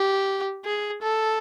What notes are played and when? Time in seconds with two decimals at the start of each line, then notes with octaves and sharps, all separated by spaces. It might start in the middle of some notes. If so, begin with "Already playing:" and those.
Already playing: G4
0.65 G#4
1.02 A4